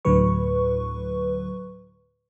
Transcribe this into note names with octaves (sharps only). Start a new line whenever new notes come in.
D2 A2 D3 F#3 B4 C#6